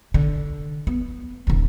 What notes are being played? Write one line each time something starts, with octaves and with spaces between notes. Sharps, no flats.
D3
B3
D#1 D#2